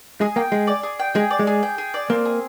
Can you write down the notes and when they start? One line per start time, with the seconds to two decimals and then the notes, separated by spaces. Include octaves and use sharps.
0.21 G#3 G#4
0.36 A#3 G5
0.52 G#3 G#4
0.67 D5
0.83 G#4
1.00 G5
1.15 G#3 G#4
1.31 D5
1.39 G#3
1.47 G#4
1.63 G5
1.78 G#4
1.94 D5
2.10 A#3 C4
2.25 G#4